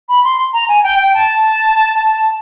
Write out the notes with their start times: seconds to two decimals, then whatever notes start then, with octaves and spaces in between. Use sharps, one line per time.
0.09 B5
0.24 C6
0.53 A#5
0.68 G#5
0.83 G5
0.99 G5
1.14 A5